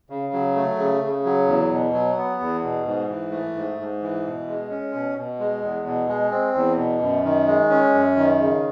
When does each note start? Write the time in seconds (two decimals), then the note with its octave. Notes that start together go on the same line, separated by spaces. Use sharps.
0.10 C#3
0.33 F#3
0.56 A3
0.78 C#3
1.02 C#3
1.25 F#3
1.47 E2
1.71 B2
1.93 F#3
2.17 B3
2.41 E2
2.64 B2
2.86 G#2
3.09 E3
3.32 A3
3.55 G#2
3.78 G#2
4.02 E3
4.25 B2
4.48 G#3
4.70 C#4
4.94 B2
5.17 B2
5.40 G#3
5.62 E2
5.86 B2
6.08 G#3
6.31 C4
6.55 E2
6.77 B2
7.01 F#2
7.24 D#3
7.46 G#3
7.70 C#4
7.93 F#2
8.17 D#3
8.40 C#3